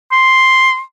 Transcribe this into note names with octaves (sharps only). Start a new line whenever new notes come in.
C6